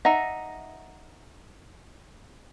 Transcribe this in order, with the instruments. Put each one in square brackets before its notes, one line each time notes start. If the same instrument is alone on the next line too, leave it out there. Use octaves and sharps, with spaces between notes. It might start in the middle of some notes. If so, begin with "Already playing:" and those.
[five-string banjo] D#4 A#5 [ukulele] E5 F#5